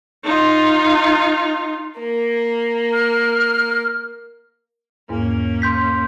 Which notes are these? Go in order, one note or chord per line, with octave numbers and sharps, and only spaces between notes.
D#4 F4
A#3
F6
E2 G#2 A#3 C#4
C6 G6 B6